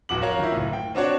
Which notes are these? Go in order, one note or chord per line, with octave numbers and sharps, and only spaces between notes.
D1 G1 F2 F#4 D6 F#7
F4 F#4 A#4 C#5 F5
D#3 E4
F#1 A2
G5
C4 D4 F#4 C#5 D5